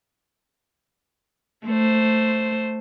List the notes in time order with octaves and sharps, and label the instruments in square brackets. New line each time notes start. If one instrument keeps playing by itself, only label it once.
[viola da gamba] A3 C5